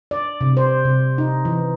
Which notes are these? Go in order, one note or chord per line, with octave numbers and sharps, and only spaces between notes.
D5
C3
C5
C3
D#4
E3